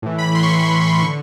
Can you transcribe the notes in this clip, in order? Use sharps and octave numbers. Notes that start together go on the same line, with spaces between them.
A2 E3
B5
C6
C#6
C6
D3 C#6